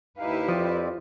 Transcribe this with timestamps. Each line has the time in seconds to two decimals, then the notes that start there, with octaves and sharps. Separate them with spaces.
0.18 D#2 D#4 E4 G4 B4 F5
0.49 F2 F3 C4 D5